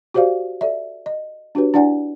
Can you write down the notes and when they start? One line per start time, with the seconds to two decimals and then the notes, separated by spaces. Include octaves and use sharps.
0.14 F#4 G4 C5 D5 F5
0.61 A4 D5 E5
1.06 D#5
1.55 D4 F#4 G4 B4 C#5
1.74 D4 E4 D5 F#5 G#5